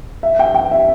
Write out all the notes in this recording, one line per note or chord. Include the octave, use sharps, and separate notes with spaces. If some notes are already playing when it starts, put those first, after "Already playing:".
E5
G5
G5
E5